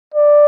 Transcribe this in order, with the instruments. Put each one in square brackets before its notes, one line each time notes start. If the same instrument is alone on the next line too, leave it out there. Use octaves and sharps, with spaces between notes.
[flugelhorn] D5